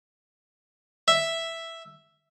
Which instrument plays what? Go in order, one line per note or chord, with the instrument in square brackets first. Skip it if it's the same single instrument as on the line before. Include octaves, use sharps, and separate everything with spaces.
[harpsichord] E5